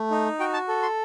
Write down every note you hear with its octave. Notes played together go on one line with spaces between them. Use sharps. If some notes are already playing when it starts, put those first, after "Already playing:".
Already playing: A3
D#4
F#4 G5
A5
A4
C6